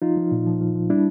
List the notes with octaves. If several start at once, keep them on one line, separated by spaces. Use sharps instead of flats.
F3 D#4 F4
F3
A#2
F3
F3
F3
G3 D4 E4